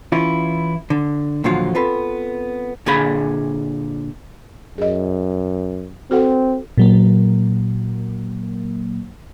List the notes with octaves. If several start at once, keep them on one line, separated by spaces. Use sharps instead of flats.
E3 C#4 E4 F4
D3
D#2 A#2 D3 F3 F#3 F4
B3 C4 F4 A4 B4
A#2 D3 G#4 B5
F#2 G#4 D#5
C4 F#4 A4 F#5
A#2 F#3 A#3